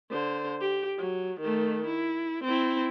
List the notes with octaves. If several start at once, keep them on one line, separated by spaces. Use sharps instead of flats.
D3 C5
G4
F#3
D#3 A3
E4
C4 E4